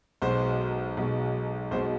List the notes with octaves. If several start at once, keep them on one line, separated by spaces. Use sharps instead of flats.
B1 B2 G#3 C5
B1 B2 G#3
B1 B2 G#3 C5